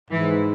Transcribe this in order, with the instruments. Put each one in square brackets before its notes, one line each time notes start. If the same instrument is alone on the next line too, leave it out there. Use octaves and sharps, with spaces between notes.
[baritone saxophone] G#2 [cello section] E3